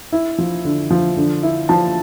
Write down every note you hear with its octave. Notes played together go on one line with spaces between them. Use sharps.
E4
F3
D3
F3
D3
E4
F3 A5